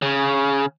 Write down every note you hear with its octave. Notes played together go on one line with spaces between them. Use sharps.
C#3